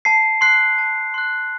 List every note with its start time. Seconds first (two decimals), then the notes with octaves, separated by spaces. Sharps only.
0.05 A5 C7
0.41 C6 F#6 C7
0.78 A5
1.14 C6 F#6